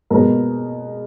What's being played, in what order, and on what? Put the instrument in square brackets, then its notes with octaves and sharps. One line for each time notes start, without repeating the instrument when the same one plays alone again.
[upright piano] B2 G#3 B3 A#4